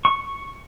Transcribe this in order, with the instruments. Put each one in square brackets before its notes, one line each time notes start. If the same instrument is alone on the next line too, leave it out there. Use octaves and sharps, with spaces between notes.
[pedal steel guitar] C#6